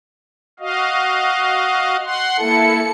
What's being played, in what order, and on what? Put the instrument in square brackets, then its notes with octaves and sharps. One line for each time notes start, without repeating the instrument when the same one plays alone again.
[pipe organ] F#4 D#5 F5
F#5 C6
[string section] A#3 A4 C#7 [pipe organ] E4